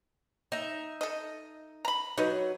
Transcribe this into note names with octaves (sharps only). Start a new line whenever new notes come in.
D#4 E5
A4 D#5
A#5 B5
F#3 D#4 B4